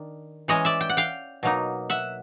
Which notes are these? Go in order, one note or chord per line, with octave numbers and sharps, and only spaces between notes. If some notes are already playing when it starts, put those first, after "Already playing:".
Already playing: D#3 D4
E3 G#3 C#4 C#5 D#5
D5 E5
G5
F#5
F5 G5
B2 F#3 A#3 D#4
E5 F#5